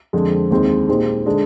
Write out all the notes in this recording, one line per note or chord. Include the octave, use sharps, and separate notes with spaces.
F2 D3 G#3 C4
D#2 D3 G#3 C4
A#2 G#3 D#4 G4 C5
D3 G#3 D4